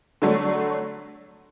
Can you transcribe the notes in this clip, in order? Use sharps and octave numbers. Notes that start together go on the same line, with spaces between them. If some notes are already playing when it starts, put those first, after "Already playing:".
D3 F#3 A3 D4